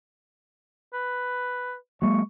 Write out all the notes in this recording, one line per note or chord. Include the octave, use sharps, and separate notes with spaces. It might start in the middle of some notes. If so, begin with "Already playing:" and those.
B4
F#3 G#3 A#3 C#6